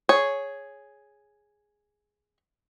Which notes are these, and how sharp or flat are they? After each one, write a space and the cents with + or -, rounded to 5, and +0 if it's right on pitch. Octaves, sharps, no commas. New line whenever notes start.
G#4 +0 C#5 +0